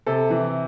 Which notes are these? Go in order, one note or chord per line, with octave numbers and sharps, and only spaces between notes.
C3 A4
E3